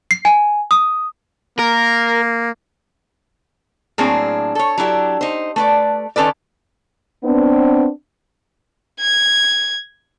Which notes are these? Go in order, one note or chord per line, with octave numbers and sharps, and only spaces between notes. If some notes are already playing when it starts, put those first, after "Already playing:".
C7
G#5
D#6
A#3 A#4
A2 F#3 A#3 C4 D4 G#4
A4 C#5
F#3 D4 E4 G4
D#4 C5
A3 B4 D5
D#3 C#4 A4 B4 D5
B3 C4 D4
G#6